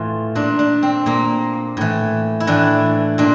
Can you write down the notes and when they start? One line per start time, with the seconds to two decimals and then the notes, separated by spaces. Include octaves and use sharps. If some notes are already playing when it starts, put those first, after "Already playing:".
Already playing: A2 E3 F4
0.35 A#2 D4
0.59 D4
0.83 C4
1.06 A#2 A#3
1.77 A2 E3
2.40 E4
2.47 A2 E3 D4
3.18 A#2 D4